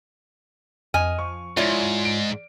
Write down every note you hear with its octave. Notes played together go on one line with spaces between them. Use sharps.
F2 D#5 G#5 F6
F3 C#6
G#2 E4 F4 C#5 D5
D7